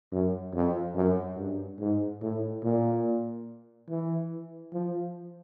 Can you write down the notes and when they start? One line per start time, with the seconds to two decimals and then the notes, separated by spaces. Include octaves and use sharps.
0.12 F#2
0.54 F2
0.95 F#2
1.37 G2
1.80 G#2
2.22 A2
2.64 A#2
3.89 E3
4.73 F3